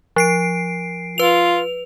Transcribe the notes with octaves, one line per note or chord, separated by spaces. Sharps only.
F3 C7 D7
F4 B4 F7